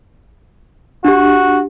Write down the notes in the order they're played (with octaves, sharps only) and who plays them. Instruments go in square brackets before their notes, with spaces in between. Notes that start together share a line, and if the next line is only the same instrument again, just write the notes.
[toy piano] D4 G4 [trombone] F#4